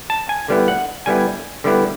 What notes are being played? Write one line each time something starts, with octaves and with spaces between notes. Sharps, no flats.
A5
G#5
D3 G3 B3 E4
F#5
D3 G3 B3 E4 G#5
D3 G3 B3 E4